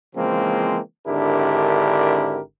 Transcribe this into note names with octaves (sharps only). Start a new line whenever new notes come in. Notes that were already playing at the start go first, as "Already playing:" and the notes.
C#3 E3 F3 G#3 A#3 C4
G#1 D3 D4 E4 G4 A#4